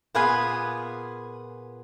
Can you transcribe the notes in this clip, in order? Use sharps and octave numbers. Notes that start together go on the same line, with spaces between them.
A#2 B3 F4 G#4 B4 G#5